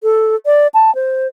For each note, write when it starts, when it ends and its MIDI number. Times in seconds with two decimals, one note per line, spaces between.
0.03 0.35 69
0.46 0.67 74
0.74 0.93 81
0.95 1.27 72